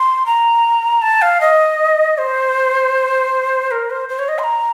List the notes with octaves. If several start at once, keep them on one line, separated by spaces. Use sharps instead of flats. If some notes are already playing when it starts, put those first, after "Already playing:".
Already playing: C6
A#5
A5
F5
D#5
C5
A#4
C5
C5
C#5
D#5
C6
A#5